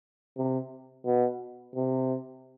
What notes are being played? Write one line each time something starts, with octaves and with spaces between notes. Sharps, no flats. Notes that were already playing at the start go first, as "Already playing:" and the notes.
C3
B2
C3